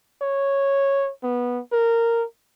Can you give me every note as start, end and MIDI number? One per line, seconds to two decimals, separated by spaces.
0.22 1.11 73
1.23 1.60 59
1.72 2.24 70